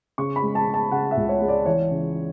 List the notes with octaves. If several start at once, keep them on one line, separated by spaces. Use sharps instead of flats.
C#3 C#6
B5
G#3
A5
C#3
A5
C#3 F#5
E5
C#2
C#5
G#3
D5
E3 C#5
C#3